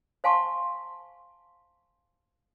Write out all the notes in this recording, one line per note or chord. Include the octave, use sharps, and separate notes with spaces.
C5 F5 G#5 A5 C6 C#6